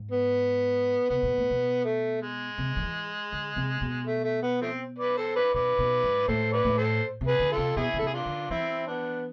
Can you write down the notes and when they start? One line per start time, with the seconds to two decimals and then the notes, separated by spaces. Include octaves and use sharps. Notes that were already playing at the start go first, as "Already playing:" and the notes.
Already playing: G#2
0.11 B3
1.10 C3 B3
1.23 B2
1.38 A2
1.51 B2
1.84 A3
2.21 G#3
2.58 C3
2.77 D3
2.83 E3
3.32 D3
3.56 C3
3.81 B2
4.06 A3
4.24 A3
4.42 B3
4.61 F3 A3 C4
4.98 B4 D5
5.16 A4 C5
5.36 B4 D5
5.54 B2 B4 D5
5.78 B2
6.03 G#2
6.28 A2 A4 C5
6.52 B4 D5
6.65 A2
6.77 A4 C5
7.21 C3
7.27 G#4 B4
7.39 D3
7.51 F4 A4
7.57 C3
7.77 B2 E4 G#4
7.93 D3
7.99 C3 A4
8.07 G#4
8.14 D4 F4
8.26 D3
8.50 E3 C4 E4
8.87 B3 D4